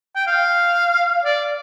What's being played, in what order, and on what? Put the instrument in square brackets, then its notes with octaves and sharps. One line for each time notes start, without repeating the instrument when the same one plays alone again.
[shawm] G5
F5
D5